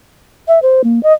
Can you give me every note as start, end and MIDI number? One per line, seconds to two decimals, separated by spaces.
0.48 0.59 76
0.62 0.81 72
0.84 1.02 58
1.03 1.13 75